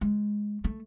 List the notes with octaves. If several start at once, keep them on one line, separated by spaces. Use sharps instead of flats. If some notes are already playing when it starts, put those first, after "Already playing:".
G#3
A3